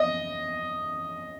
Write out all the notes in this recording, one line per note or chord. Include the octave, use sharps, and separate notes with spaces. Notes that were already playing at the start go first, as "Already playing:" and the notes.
Already playing: D#5